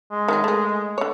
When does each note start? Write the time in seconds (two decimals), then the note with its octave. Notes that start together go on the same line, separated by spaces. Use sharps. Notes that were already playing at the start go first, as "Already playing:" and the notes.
0.12 G#3
0.28 D#3 F#3 G#4
0.44 A3 G#4
0.98 D3 C#5